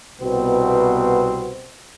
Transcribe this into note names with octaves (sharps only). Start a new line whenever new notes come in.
C2 B2 B3 C4